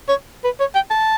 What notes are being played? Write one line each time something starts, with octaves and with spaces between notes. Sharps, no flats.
C#5
B4
C#5
G5
A5